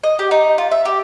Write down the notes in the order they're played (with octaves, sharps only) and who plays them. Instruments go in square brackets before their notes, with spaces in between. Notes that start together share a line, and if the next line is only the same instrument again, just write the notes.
[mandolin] D#5
G4
D#4
F4
E5
G4